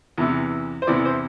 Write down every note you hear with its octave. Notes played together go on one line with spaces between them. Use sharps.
E2 C3 E3
C5
E2 C3 E3 D5
C5